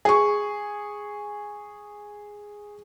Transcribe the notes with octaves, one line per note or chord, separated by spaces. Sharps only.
G#4 C#6